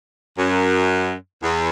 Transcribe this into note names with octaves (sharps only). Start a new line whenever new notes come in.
F#2
E2